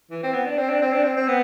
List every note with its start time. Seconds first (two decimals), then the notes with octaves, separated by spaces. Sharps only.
0.11 E3
0.23 C4
0.34 B3
0.46 D4
0.58 C4
0.70 D4
0.82 C4
0.93 D4
1.04 C4
1.17 C4
1.28 B3